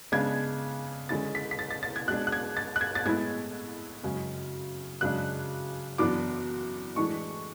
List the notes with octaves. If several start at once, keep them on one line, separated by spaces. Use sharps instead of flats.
C#3 G#3 B3 D4 G#6
D3 G#3 C#4 E4 A6
B6
B6
A6
A6
A6
G#6
B2 G#3 D4 F#6
F#6
G#6
A6
F#6
G#6
A6
A2 G#3 B3 E4 G#6
F#2 C#3 G#3 C#4
F#2 C#3 G#3 D4 F#6
F#2 E3 B3 D4 D6
A2 E3 G#3 D4 C#6